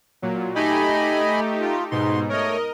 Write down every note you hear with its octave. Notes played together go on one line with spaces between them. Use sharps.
A#2 F#3
A3 D#4 G4 D#5 G#5 B5
F4
G#2 B2 D#4 C6
A3 A#4 C#5 D#5